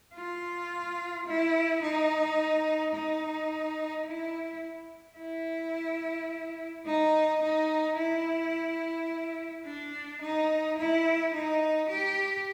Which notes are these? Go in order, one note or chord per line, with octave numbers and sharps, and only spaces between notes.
F4
E4
D#4
D#4
E4
E4
D#4
D#4
E4
D4
D#4
E4
D#4
G4